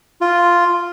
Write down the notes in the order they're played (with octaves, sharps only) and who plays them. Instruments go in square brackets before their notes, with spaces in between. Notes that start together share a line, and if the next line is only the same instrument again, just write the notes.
[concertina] F4